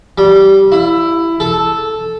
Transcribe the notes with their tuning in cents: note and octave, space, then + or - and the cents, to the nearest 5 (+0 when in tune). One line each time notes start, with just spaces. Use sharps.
G3 -15
E4 +10
A4 -5